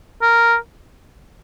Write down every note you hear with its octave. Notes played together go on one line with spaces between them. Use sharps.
A#4